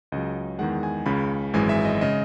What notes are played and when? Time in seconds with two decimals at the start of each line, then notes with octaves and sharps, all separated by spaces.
0.12 C#2 C#3 F#3 D#5
0.59 E2 D#3 G#3 F#5
0.83 G#5
1.06 C#2 C#3 G#3 B5
1.53 G#1 F#2 E3 G#3 G#5
1.69 E5
1.85 D#5
2.01 C#3 G#3 D#5